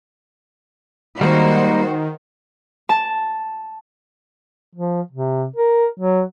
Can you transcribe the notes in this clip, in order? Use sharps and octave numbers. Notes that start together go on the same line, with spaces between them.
D#3 G3 G#3 A#3 D#4 F#4 C5
A5
F3
C3
A#4
F#3